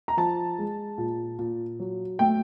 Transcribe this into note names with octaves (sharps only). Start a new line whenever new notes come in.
A#5
F3 A5
G#3
A#2
A#2
F#3
A3 G5